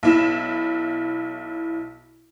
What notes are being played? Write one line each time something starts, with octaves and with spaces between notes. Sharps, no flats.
B1 E4 E7